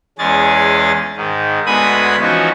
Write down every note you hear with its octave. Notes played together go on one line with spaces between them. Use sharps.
E2 G#3 C#4 G#4 A6
G#2 D#3
D2 G#3 B3 G#5 B5 D#6
E3 F3 C#4 D#4 F#4